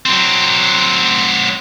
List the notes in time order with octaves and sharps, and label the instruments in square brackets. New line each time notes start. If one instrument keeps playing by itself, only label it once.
[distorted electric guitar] F#3 C4